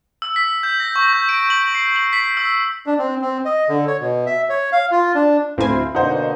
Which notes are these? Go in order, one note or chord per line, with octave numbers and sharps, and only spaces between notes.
E6
B6
G6
A#6
C#6
G6
D7
F#7
C7
F#7
B6
E6
D4
C4
C4
D#5
D3
C#5
B2
E5
C#5
F5
F4
D4
D2 A2 C4 E4 F5 G#5
B2 D3 A#3 D#4 C5 F#5